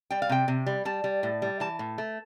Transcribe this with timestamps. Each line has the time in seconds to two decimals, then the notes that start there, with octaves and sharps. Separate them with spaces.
0.10 G3 G5
0.22 F5
0.29 C3 G5
0.48 C3
0.67 G3
0.85 G3 A5
1.04 G3
1.23 A2
1.42 G3
1.60 E3 A5
1.79 A2
1.98 A3